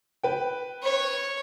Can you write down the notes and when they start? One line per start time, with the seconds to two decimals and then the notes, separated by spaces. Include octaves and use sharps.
0.23 B4 G5
0.82 C#5